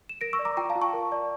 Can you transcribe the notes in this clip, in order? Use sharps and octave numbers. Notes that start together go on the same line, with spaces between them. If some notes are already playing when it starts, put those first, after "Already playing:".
E7
A#4 A#6 D7
C#6 E6
D5
A#5 D6
F4 G5 A#5
F5 A5
F4
A5 C#6
A#4
D5